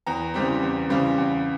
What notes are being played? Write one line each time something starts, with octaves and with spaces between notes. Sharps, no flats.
E2 A#5
C#3 E3 G3 C4
E2
C#3 E3 G3 C4
E2